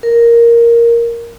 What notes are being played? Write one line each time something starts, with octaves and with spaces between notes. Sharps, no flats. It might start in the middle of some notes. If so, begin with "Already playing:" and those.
A#4